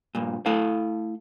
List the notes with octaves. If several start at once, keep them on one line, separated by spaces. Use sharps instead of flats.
G2 A#2
A3 E4 A4 F5